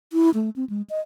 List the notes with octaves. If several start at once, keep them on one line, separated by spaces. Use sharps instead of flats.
E4
A3
C4
G#3
D#5